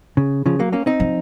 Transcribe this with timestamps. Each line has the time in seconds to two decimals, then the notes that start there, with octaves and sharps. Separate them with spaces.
0.17 C#3
0.46 C#3 F3
0.59 F#3 A#3
0.73 A#3 C#4
0.86 C4 D#4
1.00 F3